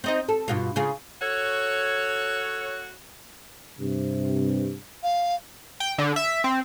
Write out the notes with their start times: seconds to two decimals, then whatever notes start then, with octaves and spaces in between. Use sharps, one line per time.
0.04 C4 D#4 D#5
0.29 A4
0.48 G2 B2 F4
0.76 C#3 F4 G#4
1.20 F#4 A4 C#5
3.78 G2 C3
5.03 F5
5.80 G5
5.98 D3
6.16 E5
6.44 C4